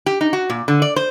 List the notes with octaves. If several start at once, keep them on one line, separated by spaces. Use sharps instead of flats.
G4
D#4
F#4
A#2
D3
D5
C5